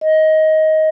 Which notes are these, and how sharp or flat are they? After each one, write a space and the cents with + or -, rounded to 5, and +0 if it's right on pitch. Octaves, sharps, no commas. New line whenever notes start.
D#5 +15